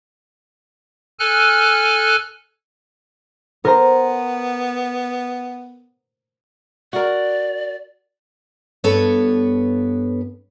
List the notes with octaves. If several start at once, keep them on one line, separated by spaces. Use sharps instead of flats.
A4 G#5 F6 F#6
B3 A#4 C5 A#5
F#4 A#4 D5
G2 B3 A4 B4 C#5